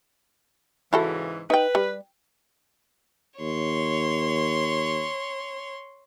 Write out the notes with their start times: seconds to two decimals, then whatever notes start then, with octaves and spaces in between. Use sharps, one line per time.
0.93 G#2 C#3 E3 E4 F#4 A4
1.50 D#4 B4 G5
1.75 G3
3.40 D#2 C#5 C6